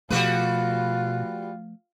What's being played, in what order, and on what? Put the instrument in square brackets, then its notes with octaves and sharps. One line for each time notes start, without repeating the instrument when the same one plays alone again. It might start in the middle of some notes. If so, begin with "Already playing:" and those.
[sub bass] B2 [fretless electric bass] F3 A3 [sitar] G3 F#4 B4 [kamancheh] F4